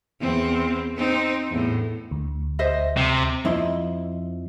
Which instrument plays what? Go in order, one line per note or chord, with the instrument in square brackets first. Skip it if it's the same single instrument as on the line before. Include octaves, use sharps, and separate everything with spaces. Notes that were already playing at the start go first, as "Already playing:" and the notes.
[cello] E2 C4
C4 D#4
E2 A2
[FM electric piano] D2
[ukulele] C5 D#5 E5
[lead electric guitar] C3
[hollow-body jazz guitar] F2 F3 E4 D#5 C6